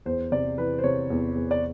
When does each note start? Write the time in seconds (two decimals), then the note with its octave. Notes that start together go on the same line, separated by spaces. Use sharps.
0.06 E2 C5
0.32 C3 D5
0.58 E3 B4
0.79 C5
0.84 C3 C#5
1.10 E2
1.35 E2
1.51 D5